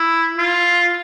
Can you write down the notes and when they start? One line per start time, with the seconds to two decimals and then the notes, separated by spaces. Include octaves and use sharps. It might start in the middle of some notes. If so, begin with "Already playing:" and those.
Already playing: E4
0.37 F4